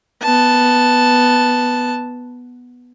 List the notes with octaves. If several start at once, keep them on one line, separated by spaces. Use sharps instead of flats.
B3 A5